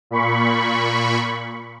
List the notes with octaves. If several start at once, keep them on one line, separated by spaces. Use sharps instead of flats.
A#2 B5 C#6